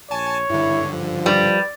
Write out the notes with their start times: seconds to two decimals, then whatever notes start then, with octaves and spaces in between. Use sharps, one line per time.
0.11 A#1 C#5 G#5 A5
0.50 G2 D3 E4
0.92 F3
1.26 G3 B4